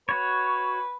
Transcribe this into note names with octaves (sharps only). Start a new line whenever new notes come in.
F#4 B4 C#5